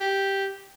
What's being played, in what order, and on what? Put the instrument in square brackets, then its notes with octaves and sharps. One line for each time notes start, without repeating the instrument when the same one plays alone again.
[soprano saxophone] G4